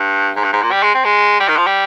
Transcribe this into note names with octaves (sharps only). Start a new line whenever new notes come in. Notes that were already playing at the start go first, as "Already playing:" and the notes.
Already playing: G2
G#2
G2
G#2
A#2
G3
G#3
C4
G#3
G3
D#3
F3
G3